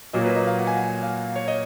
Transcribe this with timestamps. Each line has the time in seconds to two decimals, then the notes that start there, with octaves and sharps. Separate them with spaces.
0.13 A#2 F#3 A#3 D#5
0.25 B4
0.36 D#5
0.47 F5
0.59 F#5
0.67 G#5
0.77 F#5
1.03 F5
1.36 C#5
1.48 D#5